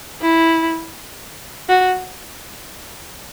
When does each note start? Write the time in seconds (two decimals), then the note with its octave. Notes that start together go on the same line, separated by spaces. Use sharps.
0.22 E4
1.69 F#4